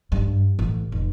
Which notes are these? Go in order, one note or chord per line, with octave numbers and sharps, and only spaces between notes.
G2
A1
F1